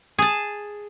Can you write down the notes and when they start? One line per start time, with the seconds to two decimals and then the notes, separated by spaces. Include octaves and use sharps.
0.19 G#4 A5